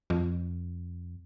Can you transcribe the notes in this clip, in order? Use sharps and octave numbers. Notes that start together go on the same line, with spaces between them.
F2